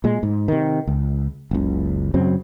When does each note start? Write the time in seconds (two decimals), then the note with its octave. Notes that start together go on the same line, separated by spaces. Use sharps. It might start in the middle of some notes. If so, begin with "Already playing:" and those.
0.04 A#2 G#3
0.23 G#2
0.48 C3 D#3
0.87 C#2
1.51 F#1 C#2
2.14 F#2 C#3 F#3 C4